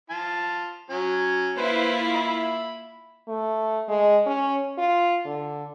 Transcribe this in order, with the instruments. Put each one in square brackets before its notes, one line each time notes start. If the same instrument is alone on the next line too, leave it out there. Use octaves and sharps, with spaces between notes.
[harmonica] F4 A5
F#3 C#4
[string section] A#3 E4 F4 [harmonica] B4 C5
[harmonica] E5 B5
[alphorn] A3
G#3
C#4
F4
D3